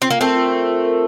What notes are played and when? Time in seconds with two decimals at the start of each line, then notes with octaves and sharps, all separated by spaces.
0.01 C4 F4
0.10 A#3
0.19 A3 C4 A#4
0.35 F4
0.51 F4
0.68 F4
0.85 A#4